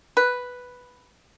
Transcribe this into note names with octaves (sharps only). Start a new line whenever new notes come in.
B4